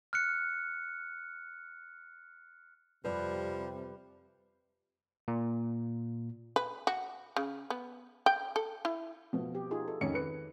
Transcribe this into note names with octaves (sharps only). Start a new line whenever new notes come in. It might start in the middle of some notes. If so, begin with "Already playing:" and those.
F6 F#6 C#7
F2 C3 F3 G3 B4 D5
A#2
B4
F#4
C#3
B3
G5
A4
E4
B2 F3
G4
D#4 F4 G#4
A4
F2 D#3 C#4 C#7
B4 C#7